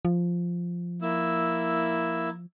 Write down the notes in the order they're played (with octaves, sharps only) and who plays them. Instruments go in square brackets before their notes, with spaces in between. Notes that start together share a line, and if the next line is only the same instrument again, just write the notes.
[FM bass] F3
[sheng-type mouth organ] A#3 E4 E6